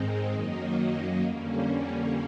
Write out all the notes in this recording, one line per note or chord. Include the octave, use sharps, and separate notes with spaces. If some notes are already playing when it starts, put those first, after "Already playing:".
Already playing: G#2 D#3 G#3 C4 D#4
F#2 D#3 F#3 A#3 D#4
F2 D3 G3 A#3 C#4